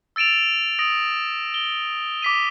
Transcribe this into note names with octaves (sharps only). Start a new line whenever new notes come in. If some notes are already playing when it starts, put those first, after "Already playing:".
E6 A6 D7 E7 F7
D#6 A#6 D7
G7
D6 B6 D#7